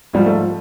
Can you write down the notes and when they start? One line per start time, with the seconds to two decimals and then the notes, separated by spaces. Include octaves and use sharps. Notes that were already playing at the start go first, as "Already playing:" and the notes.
0.13 G#2 F3 G3
0.26 A3